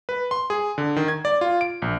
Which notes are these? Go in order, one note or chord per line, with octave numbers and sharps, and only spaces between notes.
B4
C6
G#4
D3
D#3
G#6
D5
F4
D7
A#1